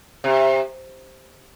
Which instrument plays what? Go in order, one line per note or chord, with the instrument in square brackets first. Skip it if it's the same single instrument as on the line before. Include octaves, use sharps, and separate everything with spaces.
[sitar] C3